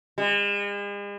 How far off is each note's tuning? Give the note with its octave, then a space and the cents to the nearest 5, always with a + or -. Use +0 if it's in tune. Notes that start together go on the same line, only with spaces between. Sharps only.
G#3 -45